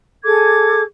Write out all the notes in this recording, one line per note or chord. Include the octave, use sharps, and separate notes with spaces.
G#4 A4 D6 G#6